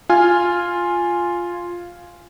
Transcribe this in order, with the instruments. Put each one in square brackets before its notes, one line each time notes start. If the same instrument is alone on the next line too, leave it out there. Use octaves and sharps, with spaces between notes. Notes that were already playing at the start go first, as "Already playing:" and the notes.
[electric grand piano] F4 G#5 F6